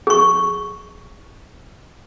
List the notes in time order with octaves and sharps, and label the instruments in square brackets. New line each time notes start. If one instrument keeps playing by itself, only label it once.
[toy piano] G#4 C#6